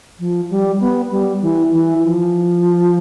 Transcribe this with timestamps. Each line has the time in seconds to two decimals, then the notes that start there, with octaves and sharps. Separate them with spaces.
0.19 F3
0.50 G3
0.80 B3
1.11 G3
1.42 E3
1.72 E3
2.04 F3